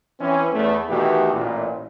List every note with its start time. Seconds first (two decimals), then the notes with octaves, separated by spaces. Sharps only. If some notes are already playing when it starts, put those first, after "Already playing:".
0.20 E3 C4 C#4
0.54 E2 A3
0.90 B2 D#3 E3 A3 F#4 G4
1.33 A1 A#2